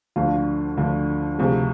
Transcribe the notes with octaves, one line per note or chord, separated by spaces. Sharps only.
D2 D3 F3 F4
D2 D3 F3
D2 C3 F3 G#4